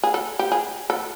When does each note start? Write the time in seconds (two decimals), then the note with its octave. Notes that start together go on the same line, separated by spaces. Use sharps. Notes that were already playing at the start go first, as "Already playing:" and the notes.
0.03 G#4
0.14 A4
0.39 G4
0.52 G#4
0.90 A4